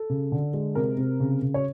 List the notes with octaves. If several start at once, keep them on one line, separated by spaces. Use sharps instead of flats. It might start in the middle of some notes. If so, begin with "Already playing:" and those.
Already playing: A4
C#3
D3
G#3
C3 A#4
C3
C#3
C#3
C#5